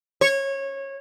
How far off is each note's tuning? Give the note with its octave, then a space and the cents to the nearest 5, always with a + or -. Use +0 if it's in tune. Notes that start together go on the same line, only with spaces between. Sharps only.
C#5 -20